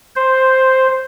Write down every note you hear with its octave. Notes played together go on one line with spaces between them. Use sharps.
C5